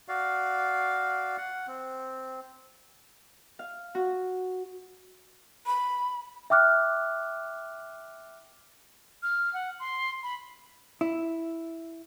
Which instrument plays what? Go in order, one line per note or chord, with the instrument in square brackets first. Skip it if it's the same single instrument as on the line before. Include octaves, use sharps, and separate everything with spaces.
[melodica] F#4 D5 F5
F#5
C4
[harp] F5
F#4
[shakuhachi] B5
[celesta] E5 G5 D6 F6 F#6
[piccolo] F6
F#5
C6
B5
[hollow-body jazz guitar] E4